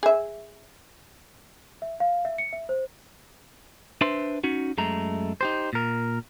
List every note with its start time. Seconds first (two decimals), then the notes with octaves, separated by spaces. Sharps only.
0.03 G#4 E5
1.82 E5
2.00 F5
2.25 E5
2.38 C#7
2.53 E5
2.69 C5
4.01 D4 B4 C5 E5 C6
4.44 C#4 D#4 F#4
4.78 F#2 G#3 A3 A#5
5.41 D#4 G4 C5
5.73 A#2 A#4